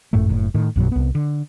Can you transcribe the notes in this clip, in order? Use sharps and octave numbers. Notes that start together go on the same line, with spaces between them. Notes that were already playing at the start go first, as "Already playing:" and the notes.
G#1 F#2 A2 A3
F#1 A2
A2 D#3
A#1 F#2 B2 F#3
C2 B3
D3